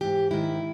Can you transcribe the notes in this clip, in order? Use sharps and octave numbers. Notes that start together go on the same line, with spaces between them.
G#2 E3 G4
G#2 D#3 E4